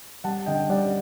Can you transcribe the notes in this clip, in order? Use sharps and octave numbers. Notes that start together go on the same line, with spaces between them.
G3 F#5 A5
D3 D#5 G5
G3 D5 F#5